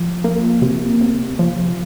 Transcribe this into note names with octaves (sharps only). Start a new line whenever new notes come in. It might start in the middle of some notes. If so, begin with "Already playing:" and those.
Already playing: F3
A#3
C3
C3
F3